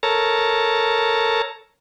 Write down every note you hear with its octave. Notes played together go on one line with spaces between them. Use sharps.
A4 A#4 C#5 A5 A#5